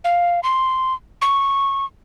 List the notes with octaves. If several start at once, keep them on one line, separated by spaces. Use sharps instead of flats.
F5
C6
C#6